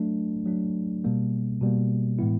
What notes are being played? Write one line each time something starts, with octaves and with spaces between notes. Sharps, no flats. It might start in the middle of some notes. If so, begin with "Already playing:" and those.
Already playing: F#3 A3 D4
F#3 A3 D4
B2 G3 A#3
B2 G3 A#3
A2 E3 G#3 B3 E4